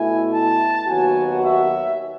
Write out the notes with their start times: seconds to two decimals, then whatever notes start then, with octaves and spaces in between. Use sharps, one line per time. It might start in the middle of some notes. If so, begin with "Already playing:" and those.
Already playing: B2 A3 E4 G#5
0.33 A5
0.88 D#2 D#3 F#3 B3 F#4 G#5
1.44 E5